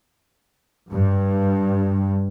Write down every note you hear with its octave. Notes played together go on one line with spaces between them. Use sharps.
G2